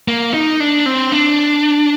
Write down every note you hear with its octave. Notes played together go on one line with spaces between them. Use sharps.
A#3
D#4
D4
C4
D4